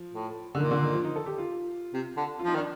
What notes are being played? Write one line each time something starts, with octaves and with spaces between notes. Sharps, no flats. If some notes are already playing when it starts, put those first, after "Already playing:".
Already playing: F3
A2
D3
A#2 D#3
D3
D#3
F3
D#4
A4
G4
F4
C3
D3
F4
F3 D#4
D#3 D4